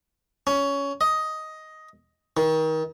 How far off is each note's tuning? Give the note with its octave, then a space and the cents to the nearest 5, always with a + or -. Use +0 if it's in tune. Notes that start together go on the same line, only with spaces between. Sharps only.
C#4 +15
D#5 +10
D#3 +30